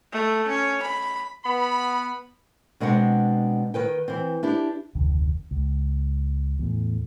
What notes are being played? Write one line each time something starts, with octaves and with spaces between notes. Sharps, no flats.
A3
C#4
B5
B3 B5
B2 G#3 C4 D4 F#5
D#3 B4 G5
E3 C4
D4 E4 G4
F1 D2 C3 D#3
C#2
E2 A2